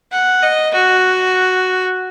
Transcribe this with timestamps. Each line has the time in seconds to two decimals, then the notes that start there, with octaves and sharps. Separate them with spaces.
0.12 F#5
0.43 D#5
0.74 F#4